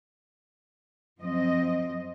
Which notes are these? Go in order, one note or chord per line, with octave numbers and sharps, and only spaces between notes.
F#2 F3 C4 D#5